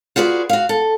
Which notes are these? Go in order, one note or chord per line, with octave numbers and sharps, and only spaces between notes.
F4 F#4 G#4 B4 D5
F#4 F5
A4